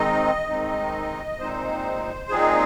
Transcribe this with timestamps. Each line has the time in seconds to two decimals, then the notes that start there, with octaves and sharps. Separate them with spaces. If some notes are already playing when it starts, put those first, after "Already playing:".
Already playing: D#3 G#3 C4 D#4 D#5
0.49 D#3 G#3 C4 D#4
1.39 A#2 G#3 C4 D#4 C5
2.29 A#2 G#3 C4 D#4 G#4